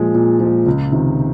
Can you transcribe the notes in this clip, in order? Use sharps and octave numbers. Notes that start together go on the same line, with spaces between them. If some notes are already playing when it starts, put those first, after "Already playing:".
Already playing: A#2 F3 G#3
A#2
F3
G#3
C#2
C3 D#3